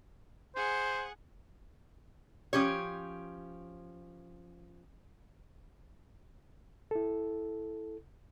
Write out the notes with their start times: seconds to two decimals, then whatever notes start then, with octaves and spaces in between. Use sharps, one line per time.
0.56 G#4 C5 F#5
2.53 F3 C#4 G4 C#5
6.91 E4 A4